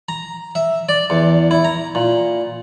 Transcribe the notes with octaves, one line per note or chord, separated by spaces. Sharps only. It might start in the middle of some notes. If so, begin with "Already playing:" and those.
A#5
E5
D5
E2
E4
A#5
A#2